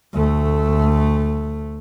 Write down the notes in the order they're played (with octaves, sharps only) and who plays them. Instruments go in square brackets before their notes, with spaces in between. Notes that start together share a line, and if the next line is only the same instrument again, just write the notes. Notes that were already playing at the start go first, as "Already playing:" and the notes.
[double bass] D2 A3